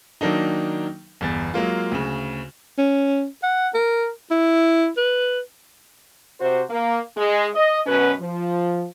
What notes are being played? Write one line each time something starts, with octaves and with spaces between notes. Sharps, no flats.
D#3 F#3 A#3 D4 D#4
G1 E2 A6
F#3 G#3 A#3 F4
D2 C#3
C#4
F#5
A#4
E4
B4
C3 F#4 C5
A#3
G#3
D#5
F#2 B2 C#4 B4
F3